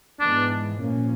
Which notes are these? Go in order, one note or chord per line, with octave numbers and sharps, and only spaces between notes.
G#2 E3 G#3 B3 D4
A#2 F3 A#3 C#4